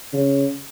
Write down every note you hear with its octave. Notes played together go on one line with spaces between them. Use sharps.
C#3